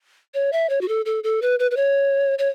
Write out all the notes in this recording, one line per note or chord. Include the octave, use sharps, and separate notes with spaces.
C#5
E5
C#5
F#4
A4
A4
A4
B4
B4
B4
C#5
C#5